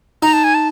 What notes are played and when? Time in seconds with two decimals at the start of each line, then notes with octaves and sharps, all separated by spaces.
0.22 D#4 A#5
0.33 A5
0.44 G#5
0.54 A5